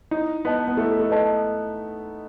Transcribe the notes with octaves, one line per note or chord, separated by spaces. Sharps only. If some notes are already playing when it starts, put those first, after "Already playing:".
D#4 E4
B3 B4 D#5 A5
B3
A3 E4
A3
B4 D#5 A5